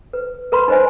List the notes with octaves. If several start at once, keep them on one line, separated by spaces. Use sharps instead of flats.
B4
A#4 B4 B5 C6
D#4 B4 C5 D#5 G#5